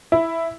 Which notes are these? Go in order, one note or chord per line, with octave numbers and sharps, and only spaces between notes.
E4